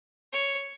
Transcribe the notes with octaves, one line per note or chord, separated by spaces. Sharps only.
C#5